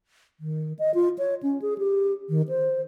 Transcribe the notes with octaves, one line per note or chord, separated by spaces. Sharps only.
D#3
D#5
F4
C#5
C#4
G#4
G4
D#3
C5